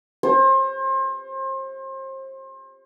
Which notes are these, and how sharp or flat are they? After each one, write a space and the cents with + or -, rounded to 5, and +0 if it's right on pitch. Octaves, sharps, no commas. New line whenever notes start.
C5 +35